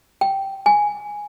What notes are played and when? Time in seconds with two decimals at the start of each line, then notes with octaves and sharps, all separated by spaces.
0.21 G5
0.66 G#5